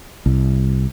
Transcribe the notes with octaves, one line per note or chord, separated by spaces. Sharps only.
C2